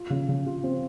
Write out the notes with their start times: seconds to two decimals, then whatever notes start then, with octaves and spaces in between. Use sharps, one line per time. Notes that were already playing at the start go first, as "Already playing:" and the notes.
Already playing: F4
0.10 C#3
0.28 C#3
0.47 F4
0.64 C4